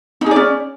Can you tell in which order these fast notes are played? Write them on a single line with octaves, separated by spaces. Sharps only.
D#4 G#4 D5 C#4